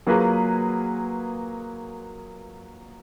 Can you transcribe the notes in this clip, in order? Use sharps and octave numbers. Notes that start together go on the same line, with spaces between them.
F#3 A#3 F4 G#4 B4